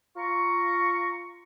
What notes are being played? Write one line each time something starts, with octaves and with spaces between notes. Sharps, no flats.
F4 A#5 C#6